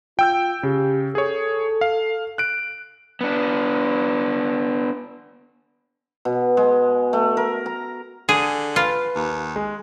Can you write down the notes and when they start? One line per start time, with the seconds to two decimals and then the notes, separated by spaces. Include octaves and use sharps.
0.19 F4 G5 E6 G6
0.63 C#3 G4
1.15 G#4 A4 C#5
1.81 F5
2.38 F#6 D7
3.21 B3 D4
6.25 B2
6.57 G#3
7.13 A3
7.37 A#4
7.66 A#5
8.29 D3 G#4 A4 D#7
8.76 F4 B4
9.15 D#2
9.56 G#3